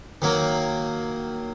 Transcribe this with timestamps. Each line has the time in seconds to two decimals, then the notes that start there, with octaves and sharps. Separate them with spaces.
0.22 D#3 F#3 A#3